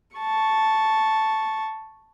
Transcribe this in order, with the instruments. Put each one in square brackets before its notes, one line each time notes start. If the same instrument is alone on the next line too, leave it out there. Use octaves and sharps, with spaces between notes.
[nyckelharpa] A5 C#6